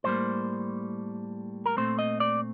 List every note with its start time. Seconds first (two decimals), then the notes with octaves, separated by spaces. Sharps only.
0.04 A2 G3 A#3 C5
1.66 A#4
1.77 A#2 A3 C4 C5
1.99 D#5
2.20 D5